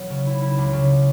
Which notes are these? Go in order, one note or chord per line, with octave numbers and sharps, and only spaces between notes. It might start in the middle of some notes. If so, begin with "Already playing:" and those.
Already playing: E1 F#3
C#3
E4
E4
C#2
C#3